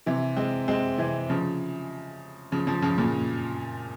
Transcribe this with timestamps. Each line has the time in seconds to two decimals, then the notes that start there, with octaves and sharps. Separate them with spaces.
0.06 C3 E3
0.36 G#3 C4
0.68 G#3 C4
0.98 C3 E3
1.29 C#3 F3
2.52 C#3 F3
2.67 C#3 F3
2.82 C#3 F3
2.98 A#2 C#3